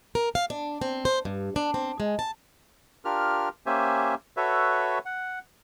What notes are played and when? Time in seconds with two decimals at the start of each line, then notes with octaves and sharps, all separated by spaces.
0.15 A#4
0.35 F5
0.50 D4
0.81 C4
1.05 C5
1.25 G2
1.56 D4
1.74 C4
2.00 G#3
2.19 A5
3.05 D4 F4 G4 A#4 F6
3.66 A#3 C#4 G4 C5 E5 G#5
4.37 F#4 A4 B4 C#5 E5
5.05 F#5